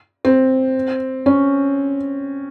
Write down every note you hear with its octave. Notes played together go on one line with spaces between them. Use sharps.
C4
C#4